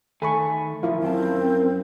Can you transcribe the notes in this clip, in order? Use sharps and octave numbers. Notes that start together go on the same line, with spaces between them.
D#3 A3 A4 G#5 B5 C#6
F3 E4 F4 A#4 F5
F#2 C4 G5 A5